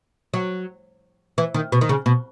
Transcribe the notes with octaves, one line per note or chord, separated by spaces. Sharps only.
F#3
E3
D#3
B2
D#3
C#3
B2